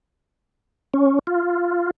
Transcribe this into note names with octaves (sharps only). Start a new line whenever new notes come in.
C#4
F4